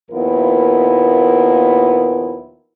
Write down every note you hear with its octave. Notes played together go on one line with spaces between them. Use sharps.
D#2 A#2 F3 B3 E4 A#4